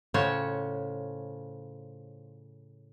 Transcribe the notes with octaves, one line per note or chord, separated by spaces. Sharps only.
A2 C#3 F4 C5 C#5 F#5